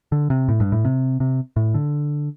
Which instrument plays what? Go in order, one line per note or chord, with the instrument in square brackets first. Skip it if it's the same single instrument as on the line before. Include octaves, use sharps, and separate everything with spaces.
[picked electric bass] D3
C3
A2
G2
A2
C3
C3
A2
D3